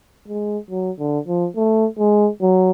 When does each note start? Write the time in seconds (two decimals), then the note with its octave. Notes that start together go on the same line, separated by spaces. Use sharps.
0.28 G#3
0.71 F#3
0.99 D3
1.27 F3
1.56 A3
1.99 G#3
2.42 F#3